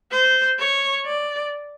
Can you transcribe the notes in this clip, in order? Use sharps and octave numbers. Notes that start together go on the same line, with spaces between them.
C5
C#5
D5